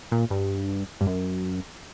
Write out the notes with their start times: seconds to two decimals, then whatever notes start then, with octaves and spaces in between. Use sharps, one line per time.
0.12 A#2
0.30 G2
1.01 G2
1.07 F#2